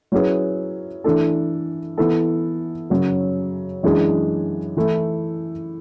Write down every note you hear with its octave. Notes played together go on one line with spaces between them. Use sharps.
F#3 C#4 E4 G#4 B4
E3 A3 D4 A4
E3 B3 E4 A4
F#2 C#3 F#3
F#2 E3 G#3 D4 G#4
E3 A3 E4